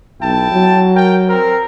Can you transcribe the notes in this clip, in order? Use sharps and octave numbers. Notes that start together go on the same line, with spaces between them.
B1 E4 G5 A5
F#3
A#4 G5
C4 A#4